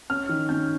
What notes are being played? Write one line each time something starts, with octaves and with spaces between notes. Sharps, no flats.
C#4 F6
D#3
C#4 G6